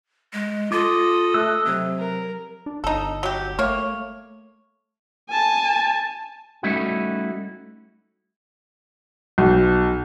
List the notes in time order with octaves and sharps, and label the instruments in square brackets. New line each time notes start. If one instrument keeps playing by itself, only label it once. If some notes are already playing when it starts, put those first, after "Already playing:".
[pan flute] G#3
[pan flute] F4 [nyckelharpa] A4 D#5 [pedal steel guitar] D6
[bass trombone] A3 [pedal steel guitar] E6 F#6
[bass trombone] C3 [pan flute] F#3
[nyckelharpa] A#4
[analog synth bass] D4
[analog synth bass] G1 [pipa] D#4 A4
[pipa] F#3 G4
[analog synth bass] A3 [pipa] A#3 C#5
[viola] G#5 A5
[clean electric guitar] G3 A3 C#4 D#4 E4 F#4
[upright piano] B1